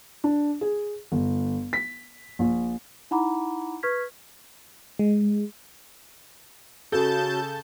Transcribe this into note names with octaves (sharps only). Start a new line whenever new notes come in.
D4
G#4
G1
B6
A#1
D#4 E4 F#5 A#5 B5 D6
B4 C#6 F6 G#6 B6
G#3
C#3 F#4 A4 A5 G6